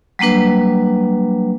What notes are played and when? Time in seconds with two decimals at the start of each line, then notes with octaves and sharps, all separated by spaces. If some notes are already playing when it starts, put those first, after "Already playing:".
0.19 F#3 G3 A#3 D4 B4